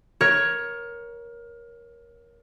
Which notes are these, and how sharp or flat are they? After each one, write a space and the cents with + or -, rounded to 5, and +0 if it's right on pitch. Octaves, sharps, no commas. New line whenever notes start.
A#4 +20 C#5 +0